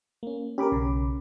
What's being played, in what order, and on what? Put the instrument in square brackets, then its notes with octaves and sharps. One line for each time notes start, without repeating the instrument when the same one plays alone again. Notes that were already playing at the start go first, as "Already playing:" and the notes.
[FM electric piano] A#3 C#4
[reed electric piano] C#4 B5 D6 [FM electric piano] G4 A#4
[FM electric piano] B1 C#3